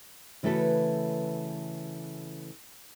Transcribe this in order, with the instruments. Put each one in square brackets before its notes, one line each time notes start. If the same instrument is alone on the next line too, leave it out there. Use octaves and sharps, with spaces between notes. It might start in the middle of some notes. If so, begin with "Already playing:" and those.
[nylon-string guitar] C#3 E3 A3 F#4 A4 B4